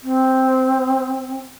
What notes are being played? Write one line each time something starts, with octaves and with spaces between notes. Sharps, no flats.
C4